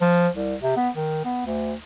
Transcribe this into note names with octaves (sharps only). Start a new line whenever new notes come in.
F3
C2
C3
B3
D#3
B3
D2